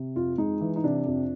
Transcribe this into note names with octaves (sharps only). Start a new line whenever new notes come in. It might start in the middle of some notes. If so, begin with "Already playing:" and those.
Already playing: C3
F2 F4
G#3 D#4
E3
D#4
C3 D4
F2